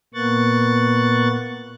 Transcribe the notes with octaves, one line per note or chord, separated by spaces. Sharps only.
A#2 A#3 B3 C#6 F#6 A6